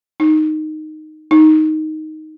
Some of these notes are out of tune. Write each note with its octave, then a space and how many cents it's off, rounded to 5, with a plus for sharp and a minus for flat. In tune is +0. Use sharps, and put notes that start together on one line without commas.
D#4 -5
D#4 +5